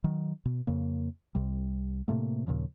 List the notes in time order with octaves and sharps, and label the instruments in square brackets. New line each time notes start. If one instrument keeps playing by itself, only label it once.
[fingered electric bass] D#3 F#3
B2
F2 C#3 A#3
C2 C3 G3
A2 C3 A3 A#3
D#2 A#2 C#3 F3